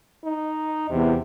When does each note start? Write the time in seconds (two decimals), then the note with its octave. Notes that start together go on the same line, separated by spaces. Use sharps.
0.25 D#4
0.90 E2 C3